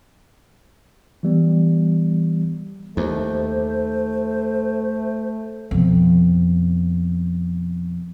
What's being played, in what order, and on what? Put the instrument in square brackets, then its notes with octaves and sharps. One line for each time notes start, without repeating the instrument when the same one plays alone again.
[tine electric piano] E3 G3 B3
[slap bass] D#2 [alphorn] A3 [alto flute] C5
[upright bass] F2 B2